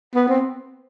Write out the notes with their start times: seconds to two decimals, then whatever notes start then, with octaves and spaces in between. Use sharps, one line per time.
0.15 B3
0.28 C4